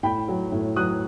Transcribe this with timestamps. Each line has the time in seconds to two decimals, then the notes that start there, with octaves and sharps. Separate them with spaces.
0.03 A2 G5 B5
0.28 F#3
0.52 A2
0.76 F#3 D#6 F#6